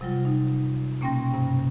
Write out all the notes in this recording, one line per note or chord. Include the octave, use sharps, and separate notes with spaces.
C3 F#3 G3 F4
D#4
B2 A#3 C#4 G5 C6 A#6
G2 C3